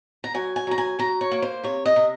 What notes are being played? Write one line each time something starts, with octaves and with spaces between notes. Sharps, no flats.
A#5
F#3 G#5
G#5
F#3 A#5
G#5
F#3 A#5
C#5
A#3
C5
C3 C#5
D#5
C3